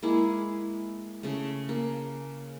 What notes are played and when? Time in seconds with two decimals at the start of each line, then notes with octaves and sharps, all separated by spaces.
0.02 G#3 A#3 E4 G#4
1.23 C#3 A3
1.69 A#3